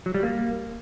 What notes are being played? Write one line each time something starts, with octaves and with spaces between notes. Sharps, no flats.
F#3
G3
A#3